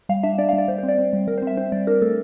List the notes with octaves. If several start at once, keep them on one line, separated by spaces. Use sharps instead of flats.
G3 F5
D4 E5
D4 D5
F5
G3
D5
G3 C5
C5
C4
D5
C4
G3
G3 A#4
C5
C4 E5
C4 C5
G3 D5
D4 A#4
A3 A4